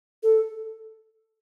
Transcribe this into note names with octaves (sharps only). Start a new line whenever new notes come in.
A4